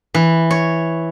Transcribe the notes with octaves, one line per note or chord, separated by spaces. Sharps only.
E3
C#5